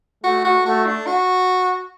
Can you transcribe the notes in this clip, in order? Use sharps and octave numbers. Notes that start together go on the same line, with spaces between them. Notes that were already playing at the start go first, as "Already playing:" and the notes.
A3 F#4
F#4
A3 F#4
D4
F#4